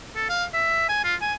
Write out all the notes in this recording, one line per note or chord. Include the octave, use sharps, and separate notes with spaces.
A4
F5
E5
G#5
F4
G#5